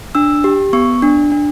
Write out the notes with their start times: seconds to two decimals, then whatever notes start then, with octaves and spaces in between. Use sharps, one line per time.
0.15 D4 E6
0.44 G4
0.73 B3 C#6
1.02 D4
1.32 D4